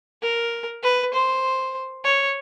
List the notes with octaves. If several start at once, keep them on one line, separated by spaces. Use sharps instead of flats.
A#4
B4
C5
C#5